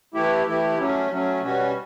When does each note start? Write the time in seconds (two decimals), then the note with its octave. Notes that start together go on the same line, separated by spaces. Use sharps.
0.14 E3 A3 E4 G4
0.46 E3 A3 E4 G4
0.78 F#3 A3 C#4
1.10 F#3 A3 C#4
1.42 B2 G3 C#4 F#4